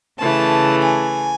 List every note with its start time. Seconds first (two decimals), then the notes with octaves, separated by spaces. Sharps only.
0.19 C#3 E3 A3 A5
0.82 G#5